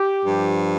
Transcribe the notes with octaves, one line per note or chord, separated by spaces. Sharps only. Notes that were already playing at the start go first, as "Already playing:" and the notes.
Already playing: G4
G2 F3